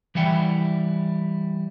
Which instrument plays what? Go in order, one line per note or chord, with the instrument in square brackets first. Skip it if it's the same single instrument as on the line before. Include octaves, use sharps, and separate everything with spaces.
[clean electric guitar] E3 G3 E4 F#5 G5